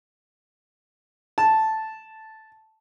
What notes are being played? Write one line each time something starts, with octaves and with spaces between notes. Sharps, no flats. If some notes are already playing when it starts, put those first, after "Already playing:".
A5